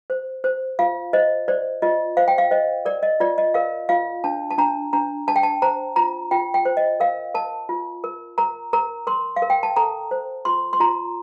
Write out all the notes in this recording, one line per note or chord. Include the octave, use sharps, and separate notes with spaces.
C5
C5
F4 F5
C5 D#5
C5 D5
F4 D#5
C5 F5
G5
F5
C5 D#5
A#4 D5
D#5
F4 D5
D#5
A#4 F5
F4 F5
D4 A5
A5
D4 A#5
D4 A#5
D4 A5
G5
A5
C5 A#5
F4 A#5
F4 G5
G5
C5
D#5
A#4 F5
A#4 A5
F4
A#4
A#4 A#5
A#4 A#5
A#4 C6
F5
A#4
G5
A5
A4 A#5
C5
F4 C6
C6
F4 A#5